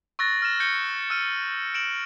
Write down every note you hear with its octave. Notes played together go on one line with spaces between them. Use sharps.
C#6 E6 F#6 A6 A#6
F6 E7
G6 C#7 G7
E6 F6 D#7
D7 E7 F#7